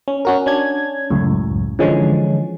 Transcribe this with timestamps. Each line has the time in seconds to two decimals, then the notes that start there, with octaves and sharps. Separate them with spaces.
0.08 C#4
0.25 C#4 F#4 A#4
0.46 C#4 D4 G#6
1.10 C#2 F#2 A2
1.79 D3 E3 F3 G#3 C#4